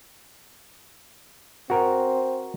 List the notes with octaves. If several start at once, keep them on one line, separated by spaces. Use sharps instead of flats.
C4 F#4 A#4